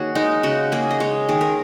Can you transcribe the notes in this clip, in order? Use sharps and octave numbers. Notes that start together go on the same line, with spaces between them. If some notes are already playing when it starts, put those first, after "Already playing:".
Already playing: D#3 A#3 F#4 G#4 C#5
G#3 D#4
C#3 F#4
A#3 G#4
D#5
G#3 C#5
D#3 G#4
A#4